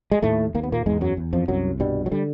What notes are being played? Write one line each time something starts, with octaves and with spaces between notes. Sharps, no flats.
G#3
D#2 A2 A3
D#2 A#3
B3
A#2 A#3
E2 G#2 G#3
F#2 F#3
E2
F2 F3
C2 F#2 F#3
G2 B2 G3
F#3
D3 G3